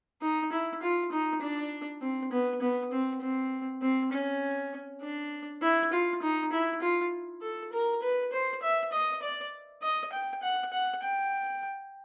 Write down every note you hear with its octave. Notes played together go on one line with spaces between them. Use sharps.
D#4
E4
F4
D#4
D4
C4
B3
B3
C4
C4
C4
C#4
D4
E4
F4
D#4
E4
F4
A4
A#4
B4
C5
E5
D#5
D5
D#5
G5
F#5
F#5
G5